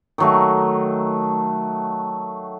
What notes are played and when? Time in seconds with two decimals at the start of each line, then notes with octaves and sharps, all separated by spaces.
0.18 D#3 F#3 A3